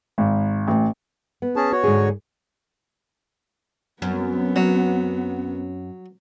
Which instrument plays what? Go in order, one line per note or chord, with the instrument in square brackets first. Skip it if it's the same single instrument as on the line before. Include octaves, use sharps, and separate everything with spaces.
[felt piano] G#1
A1
[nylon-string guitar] B3
[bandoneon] C#4 G#4 A5
F#4 C#5
[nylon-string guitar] G#2 D3 G#4
[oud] F#2 [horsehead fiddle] B3 C4
[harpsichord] F#3